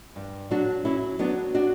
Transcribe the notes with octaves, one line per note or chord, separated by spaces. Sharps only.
G2
F#3 D4 F#4
F#3 C#4 E4
F#3 B3 D4
D4 F#4